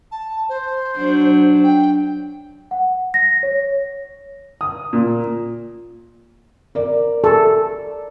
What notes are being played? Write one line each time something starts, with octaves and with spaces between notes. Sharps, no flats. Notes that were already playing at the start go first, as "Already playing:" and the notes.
A5
C5
F#3 D4
G5
F#5
A#6
C#5
D#6
A#2
A#4 D5
A4